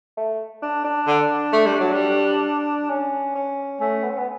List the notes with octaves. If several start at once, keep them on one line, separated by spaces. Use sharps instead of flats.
A3
D4
D4
D3
A3
G3
F#3
G3
C#4
C#4
A3 C#4
B3
C#4
B3